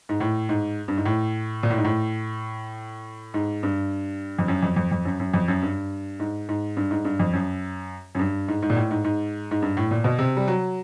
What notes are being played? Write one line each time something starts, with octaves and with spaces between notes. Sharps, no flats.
G#2
A2
G#2
G2
G#2
A2
A#2
A2
G#2
A2
G#2
G2
F2
F#2
F2
F2
F2
F#2
F#2
F2
F#2
G2
G#2
G#2
G2
G#2
G2
F2
F#2
F#2
G2
G#2
G#2
A#2
A2
G#2
G#2
G#2
G2
A2
A#2
B2
C3
G3
F#3